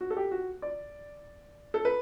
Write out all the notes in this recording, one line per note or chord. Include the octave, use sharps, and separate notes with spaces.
F#4
A4
G4
F#4
D5
A4
B4